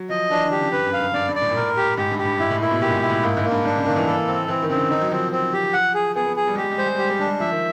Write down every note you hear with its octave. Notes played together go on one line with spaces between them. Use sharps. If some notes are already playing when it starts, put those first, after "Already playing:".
Already playing: F#3
F3 D#5
E3 D4
D3
G4
C#3
G2 B4
F#2
F5
G2
G2 D5
G2
D5
A2
A#2
A2 A#4
G4
G#2 G4
G2
G4
G2
G#2 E4
A2
A#2 E4
B2
A#2 G4
G#2
A2
E4
A2
G#2 A#3
G#2
A#3
G2
G2 D4
C#3
D#3 A#3
E3
A4
C4
E3 C4
D#3
C#3 C4
D3
D#3 D#4
F#3
F3 C4
C4
G4
F#5
G#4
B3 G#4
B3
G#4
G3
G#3 G4
G3
G#3
G3 C5
G#3
G3
G#3 G4
G3
G#3 D4
G3
F3 E5
D#3